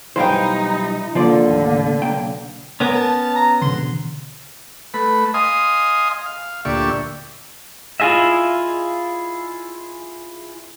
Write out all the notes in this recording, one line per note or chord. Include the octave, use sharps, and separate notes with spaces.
B1 E3 G3 D#4 E4 C5 F5 G5
D3 F3 A#3 F4 D5
D#2 A2
B1 A#3 G5
B3 C#4 A#4
A5
A#5
B2 D3 E3 C6
A3 B4 B5
D#5 F5 G#5 C6 D#6
F5
D2 A#2 G4 D5 E5 C#6
E4 F4 G#4 D#5 E5